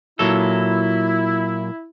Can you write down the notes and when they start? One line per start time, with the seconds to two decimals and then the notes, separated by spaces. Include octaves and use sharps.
0.19 A#2 F#3 E4 A4